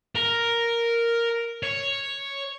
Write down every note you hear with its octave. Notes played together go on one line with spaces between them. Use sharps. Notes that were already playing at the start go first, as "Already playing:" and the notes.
A#4
C#5